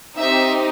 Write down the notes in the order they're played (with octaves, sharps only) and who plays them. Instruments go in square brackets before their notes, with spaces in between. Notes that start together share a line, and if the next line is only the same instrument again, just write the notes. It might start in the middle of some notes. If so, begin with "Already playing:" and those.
[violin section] C4 D#4 G4 E5